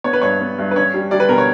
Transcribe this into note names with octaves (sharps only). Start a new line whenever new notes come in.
B3 C#5
B4
G2 C#5
B3
G2
B4
C#4 C#5
G3
G3 D5
B4
B2 A#4
C#5